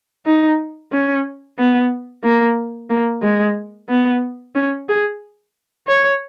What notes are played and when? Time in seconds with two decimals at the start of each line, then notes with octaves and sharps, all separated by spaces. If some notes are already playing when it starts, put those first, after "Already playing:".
0.26 D#4
0.92 C#4
1.58 B3
2.24 A#3
2.90 A#3
3.23 G#3
3.89 B3
4.55 C#4
4.89 G#4
5.88 C#5